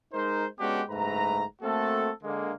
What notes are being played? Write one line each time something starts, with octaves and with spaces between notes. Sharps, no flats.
G#3 D#4 A#4 C5
G#3 B3 C#4 D4 F#4 G4
F#1 G#2 A3 B4 A#5
A3 A#3 C4 F#4 A4
D3 G#3 A#3